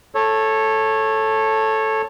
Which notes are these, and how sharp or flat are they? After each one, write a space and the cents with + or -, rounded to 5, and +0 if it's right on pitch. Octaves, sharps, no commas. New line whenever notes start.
A4 +0 C#5 -15